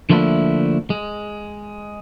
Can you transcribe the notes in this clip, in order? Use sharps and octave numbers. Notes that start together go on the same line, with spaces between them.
D3 F3 A3 A#3 D4 E4
G#3